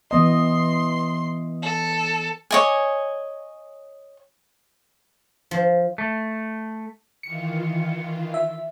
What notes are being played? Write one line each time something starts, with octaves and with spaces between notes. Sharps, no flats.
E3 B3 D#5 C6
A4
C#5 D#5 G#5
F3
A3
D#3 E3 F4 C#7
E5